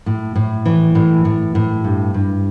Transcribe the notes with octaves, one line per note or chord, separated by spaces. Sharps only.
A2
A2
E3
A2
A2
A2
G2
G2